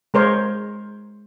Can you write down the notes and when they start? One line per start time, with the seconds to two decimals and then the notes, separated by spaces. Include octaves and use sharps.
0.14 G#3 A#4 C5 C#5